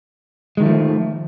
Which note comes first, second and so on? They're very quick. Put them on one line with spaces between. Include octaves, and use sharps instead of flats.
G#3 D#3 A3 F3